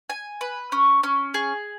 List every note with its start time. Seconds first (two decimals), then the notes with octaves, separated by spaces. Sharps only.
0.10 G#5
0.41 B4
0.72 C#4
1.03 C#4
1.34 G#4